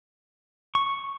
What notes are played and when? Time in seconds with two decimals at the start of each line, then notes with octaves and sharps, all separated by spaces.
0.75 C#6